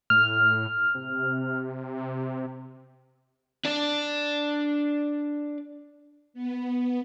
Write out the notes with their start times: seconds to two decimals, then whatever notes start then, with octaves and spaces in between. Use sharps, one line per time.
0.10 A2 F6
0.95 C3
3.65 D4 D5
6.34 B3